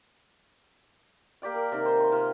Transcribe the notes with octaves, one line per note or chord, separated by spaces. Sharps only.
A#3 G4 D5 G5
A#4
C3 D#3
C5
C5 C6
C3 F4